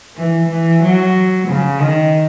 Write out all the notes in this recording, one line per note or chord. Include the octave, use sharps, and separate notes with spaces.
E3
E3
F#3
C#3
D#3